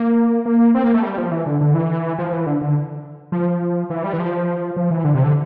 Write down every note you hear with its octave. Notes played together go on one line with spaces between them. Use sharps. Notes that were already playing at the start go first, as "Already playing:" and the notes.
Already playing: A#3
A#3
C4
A#3
A3
G3
F3
E3
D3
D3
E3
F3
E3
D3
D3
F3
E3
G3
E3
F3
F3
E3
D3
C3
D3